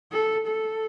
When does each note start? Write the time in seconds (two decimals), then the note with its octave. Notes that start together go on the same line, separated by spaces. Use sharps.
0.12 A4
0.47 A4